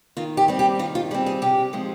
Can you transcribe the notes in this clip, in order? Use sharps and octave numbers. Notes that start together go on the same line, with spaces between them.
D#3 F4
G4
G3 C4
G4
D#3 F4
F4
G3 C4 G#4
G#4
C3 G4
F3 G#3 C4 D#4